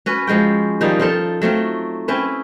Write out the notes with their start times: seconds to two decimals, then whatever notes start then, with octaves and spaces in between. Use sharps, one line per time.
0.06 C#4 F#4 B4
0.27 F3 G#3 F#4 G5
0.81 D#3 F3 G3 D#4
0.99 F3 F4 A4
1.42 F#3 A3 C4 F4
2.08 C4 C#4 E4 B4